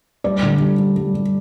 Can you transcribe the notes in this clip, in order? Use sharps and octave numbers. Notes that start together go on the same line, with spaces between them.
G3 D5
D3
G3
G3
G3
G3